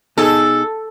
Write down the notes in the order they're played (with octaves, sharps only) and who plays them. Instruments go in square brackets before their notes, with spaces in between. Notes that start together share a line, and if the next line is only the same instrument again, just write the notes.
[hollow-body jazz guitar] B2 D#4 G#4 [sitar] A4